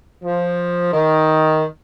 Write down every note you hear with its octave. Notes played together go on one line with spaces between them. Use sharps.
F3
D#3